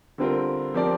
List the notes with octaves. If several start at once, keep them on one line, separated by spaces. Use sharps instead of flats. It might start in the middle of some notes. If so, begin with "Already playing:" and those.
D3 G3 C4 F4 A#4
F3 C4 G4 A#4 D5